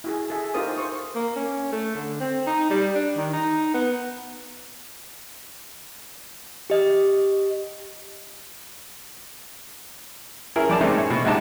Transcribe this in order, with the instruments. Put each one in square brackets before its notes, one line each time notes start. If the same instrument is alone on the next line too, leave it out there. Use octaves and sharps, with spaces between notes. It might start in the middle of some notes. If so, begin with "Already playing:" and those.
[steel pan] E4 F#4 G#4
G#4 A4 E5
D#4 F4 G4 A#4 C5 D#6
C5 C#6 D#6
[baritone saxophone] A#3
C#4
A3
D3
C4
D#4
G3
D4
D#3
D#4
B3
[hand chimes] G4 D#5
[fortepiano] C#4 E4 G#4 A#4
F2 D5 A5
G#2 C#3 A3 C4 D#4
C#4 C#5
B2
C#2 G#2 C3 D#4 F#5 A5